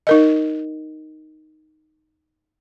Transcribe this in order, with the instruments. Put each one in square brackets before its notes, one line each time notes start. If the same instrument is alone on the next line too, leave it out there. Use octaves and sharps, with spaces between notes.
[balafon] D#4 A#4 D#5